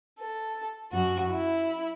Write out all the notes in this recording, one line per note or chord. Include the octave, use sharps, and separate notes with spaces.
A4
F#2 F#4
E4